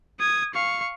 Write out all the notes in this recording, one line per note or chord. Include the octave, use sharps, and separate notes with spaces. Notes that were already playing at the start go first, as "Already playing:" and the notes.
D#6 G#6
F5 C#6